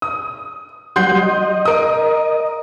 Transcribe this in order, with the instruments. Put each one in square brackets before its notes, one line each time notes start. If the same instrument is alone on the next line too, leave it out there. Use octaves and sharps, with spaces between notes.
[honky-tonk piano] D#6
[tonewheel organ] F#3 G3 F#5 [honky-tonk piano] C6 G6 C7
[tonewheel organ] D#5
[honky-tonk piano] A#4 D#6